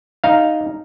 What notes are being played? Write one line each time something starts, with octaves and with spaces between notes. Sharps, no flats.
D#4 F5